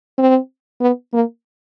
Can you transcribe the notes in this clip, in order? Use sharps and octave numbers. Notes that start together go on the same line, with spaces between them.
C4
B3
A#3